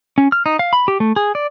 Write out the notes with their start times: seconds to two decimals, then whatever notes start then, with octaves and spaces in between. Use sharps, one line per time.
0.18 C#4
0.32 F6
0.46 D#4
0.59 F5
0.73 B5
0.88 G4
1.00 A3
1.16 G#4
1.35 D5